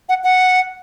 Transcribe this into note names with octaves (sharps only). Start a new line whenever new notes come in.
F#5
F#5